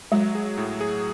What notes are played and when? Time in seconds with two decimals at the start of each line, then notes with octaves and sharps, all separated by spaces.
0.12 F#3 G#3
0.35 G#4
0.57 A2
0.81 G#4